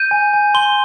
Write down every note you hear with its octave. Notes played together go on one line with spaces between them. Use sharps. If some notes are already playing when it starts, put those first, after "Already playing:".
Already playing: G6 D#7
G#5
G#5
C6 G7